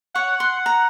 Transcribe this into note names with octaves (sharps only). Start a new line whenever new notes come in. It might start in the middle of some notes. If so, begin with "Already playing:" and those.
C#5 F#5
C6
A#5